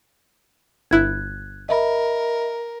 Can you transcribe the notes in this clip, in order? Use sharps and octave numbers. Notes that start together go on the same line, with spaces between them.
G1 E4 F#6 G#6
A#4 D#5 E5 B5